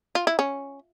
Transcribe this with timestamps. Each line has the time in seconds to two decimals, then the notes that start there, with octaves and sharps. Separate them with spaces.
0.15 F4
0.27 E4
0.39 C#4